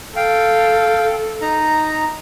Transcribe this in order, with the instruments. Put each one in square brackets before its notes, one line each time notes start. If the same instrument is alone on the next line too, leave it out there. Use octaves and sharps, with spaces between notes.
[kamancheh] A4 [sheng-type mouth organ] F5 G5
[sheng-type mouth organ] D#4 A#5